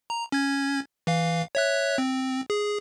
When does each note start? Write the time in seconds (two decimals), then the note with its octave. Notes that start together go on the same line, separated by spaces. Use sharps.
0.10 A#5
0.32 C#4 G#6
1.07 E3 F5
1.55 C#5 E5 F#6
1.98 C4
2.50 G#4